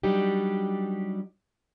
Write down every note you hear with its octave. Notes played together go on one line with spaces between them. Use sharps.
F#3 G3 D4 D#4 G4